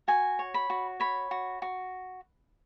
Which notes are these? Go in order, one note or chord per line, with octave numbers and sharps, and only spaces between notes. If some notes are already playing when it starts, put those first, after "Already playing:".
F#4 G#5
C#5
B5
F#4
C#5 B5
F#4
F#4